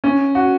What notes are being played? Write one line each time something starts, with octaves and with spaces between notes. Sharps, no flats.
C#4
F#4